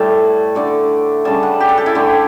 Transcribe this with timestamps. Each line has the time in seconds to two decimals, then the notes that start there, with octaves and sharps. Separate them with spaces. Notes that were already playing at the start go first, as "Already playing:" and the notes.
Already playing: A2 G3 A3 A5
0.55 D3 A3 D5
1.25 C#3 G3 A5
1.43 F#5
1.60 G4
1.69 A4
1.78 G4
1.86 E4
1.95 D3 A3